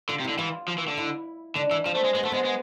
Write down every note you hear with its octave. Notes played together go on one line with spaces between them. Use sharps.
D3 F4
C3
D3 E4
E3 F4
F3
E3
D3
E4
D3 D4
E3 E4
F3 C4
A3
G#3
G#3 B3
A3 C4
G#3 B3
G#3